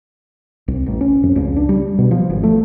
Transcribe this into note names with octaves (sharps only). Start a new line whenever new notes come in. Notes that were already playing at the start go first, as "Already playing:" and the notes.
C2
A1
C#4
F2
C#2
D4
G3
B2
F3
G#1
A3